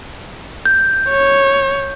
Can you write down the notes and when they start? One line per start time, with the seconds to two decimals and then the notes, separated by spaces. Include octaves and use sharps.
0.66 G6
1.09 C#5